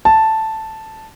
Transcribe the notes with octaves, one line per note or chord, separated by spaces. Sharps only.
A5